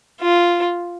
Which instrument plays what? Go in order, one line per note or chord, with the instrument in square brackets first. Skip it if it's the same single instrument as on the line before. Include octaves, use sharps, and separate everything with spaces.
[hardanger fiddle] F4